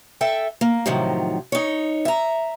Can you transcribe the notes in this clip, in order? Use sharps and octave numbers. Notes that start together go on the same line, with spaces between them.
A4 E5 G5
A#3
A2 C3 D#3 F3 F#3
D#4 C#5
E5 A#5